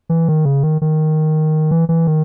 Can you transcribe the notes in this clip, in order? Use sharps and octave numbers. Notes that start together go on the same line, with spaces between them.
E3
D#3
C#3
D#3
D#3
E3
E3
D#3